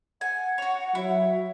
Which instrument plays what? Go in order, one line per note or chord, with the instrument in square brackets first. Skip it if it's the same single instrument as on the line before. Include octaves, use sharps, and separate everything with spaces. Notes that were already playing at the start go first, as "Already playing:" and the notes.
[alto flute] F#5 [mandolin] G#5
[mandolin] F#4 C#5
[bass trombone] F#3 [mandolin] E4